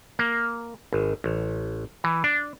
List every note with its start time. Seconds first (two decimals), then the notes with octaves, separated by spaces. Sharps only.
0.19 A#3
0.93 G#1
1.24 A1
2.04 E3
2.24 D4